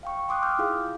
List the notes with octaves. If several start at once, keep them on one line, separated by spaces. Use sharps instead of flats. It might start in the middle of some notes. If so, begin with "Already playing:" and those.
F5 G5 C#6
G5 C6 D6 D#6 F#6
D6 F6 G6
E4 F4 G#4 F5